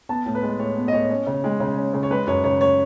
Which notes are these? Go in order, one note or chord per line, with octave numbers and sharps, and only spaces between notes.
B3 A5
A2
B4
G#3
A2 C#5
B3
D#5
A2 C#5
C#4
C#3
G#3
C#3
C#4
C#3
C#5
G#3 B4
F#2 C#5
C#3 C#5
C#5